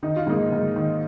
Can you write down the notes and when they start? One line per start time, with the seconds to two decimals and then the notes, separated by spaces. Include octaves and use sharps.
0.03 D#3 D#4
0.16 F4
0.27 G#2 A#3 D#4
0.52 G#2
0.76 D#3